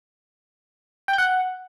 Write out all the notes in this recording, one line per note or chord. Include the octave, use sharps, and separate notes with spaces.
G5
G6
F#5